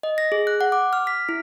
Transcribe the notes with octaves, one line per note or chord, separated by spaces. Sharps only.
D#5
A#6
G#4
F#6
F#5
D6
F6
B6
E4